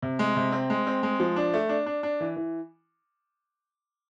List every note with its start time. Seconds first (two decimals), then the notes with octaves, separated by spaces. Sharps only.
0.02 C3
0.19 G#3
0.36 C3
0.52 C4
0.70 G#3
0.87 C4
1.03 G#3
1.19 F3
1.36 D4
1.54 A3
1.69 D4
1.86 D4
2.03 D4
2.20 E3
2.36 E3